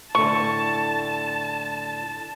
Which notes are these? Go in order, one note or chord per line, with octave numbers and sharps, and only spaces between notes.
A2 D3 A5 C#6